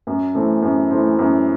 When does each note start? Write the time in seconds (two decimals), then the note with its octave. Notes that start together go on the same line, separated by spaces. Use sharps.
0.07 F#2
0.35 E3 A3 C4
0.62 F#2
0.91 E3 A3 C4
1.19 F#2